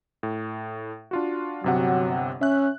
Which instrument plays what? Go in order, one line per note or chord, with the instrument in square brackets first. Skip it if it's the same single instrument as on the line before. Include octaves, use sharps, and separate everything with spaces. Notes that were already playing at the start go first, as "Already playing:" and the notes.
[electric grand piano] A2
D4 F4 F#4
[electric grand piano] G1 C3 F#5 [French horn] F#3
[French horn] C#4 [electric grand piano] E5 F#6